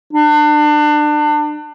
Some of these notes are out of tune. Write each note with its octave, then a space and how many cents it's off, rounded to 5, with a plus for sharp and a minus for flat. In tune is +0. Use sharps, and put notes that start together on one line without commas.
D4 +30